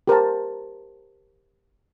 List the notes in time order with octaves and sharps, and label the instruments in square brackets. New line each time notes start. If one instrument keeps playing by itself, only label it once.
[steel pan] G4 A#4 C5 A5